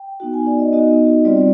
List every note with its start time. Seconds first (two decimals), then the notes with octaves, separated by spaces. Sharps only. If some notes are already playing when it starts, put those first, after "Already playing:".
Already playing: G5
0.20 B3 D#4 F#4
0.33 G#5
0.46 D5
0.59 D#5
0.73 B3 D#4 F#4 D#5
1.25 G3 C4 F4 D5